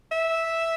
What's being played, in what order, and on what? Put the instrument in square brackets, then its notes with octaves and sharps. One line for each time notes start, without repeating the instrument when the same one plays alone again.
[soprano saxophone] E5